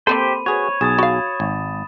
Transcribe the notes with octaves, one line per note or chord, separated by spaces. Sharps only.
A#3 C4 G4 A4 C5 B5 D#7
F#4 G#4 B4 C#5
B1 G#4 D#6 A6 E7
F#4 F5 B5
G#1